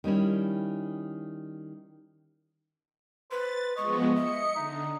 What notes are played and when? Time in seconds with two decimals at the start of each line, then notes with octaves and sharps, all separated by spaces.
0.04 D#3 G3 C#4 E4
3.31 B4 C5 A6
3.77 F3 G#3 B3 D#5 C#6
4.16 E5 C#7
4.56 D3 D#4